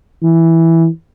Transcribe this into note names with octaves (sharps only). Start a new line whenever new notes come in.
E3